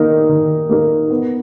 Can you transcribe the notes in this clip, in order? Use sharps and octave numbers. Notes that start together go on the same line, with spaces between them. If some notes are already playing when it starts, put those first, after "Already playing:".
Already playing: D#3 A#3 D#4 A#4
D#3
A#3 D#4 A#4
B3